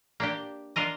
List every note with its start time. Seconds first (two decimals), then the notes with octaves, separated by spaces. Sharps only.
0.20 A#3 D4 G4
0.76 D4 F4 A#4 D#5